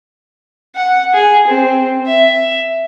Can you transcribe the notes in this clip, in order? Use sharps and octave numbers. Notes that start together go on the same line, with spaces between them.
F#5
G#4
C4
E5